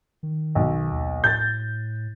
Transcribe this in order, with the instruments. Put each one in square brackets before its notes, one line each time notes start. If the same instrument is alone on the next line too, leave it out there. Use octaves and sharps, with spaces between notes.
[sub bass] D#3
[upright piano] B1
[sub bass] D#2
[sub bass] A2 [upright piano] G6 A6